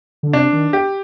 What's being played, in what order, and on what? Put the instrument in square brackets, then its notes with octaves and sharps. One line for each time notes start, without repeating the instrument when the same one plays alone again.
[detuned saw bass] D3
[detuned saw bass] C3 [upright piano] D4
[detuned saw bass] D#3
[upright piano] G4